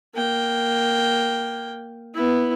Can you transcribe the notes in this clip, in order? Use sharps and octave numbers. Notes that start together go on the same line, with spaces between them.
A#3 G5
B3 E4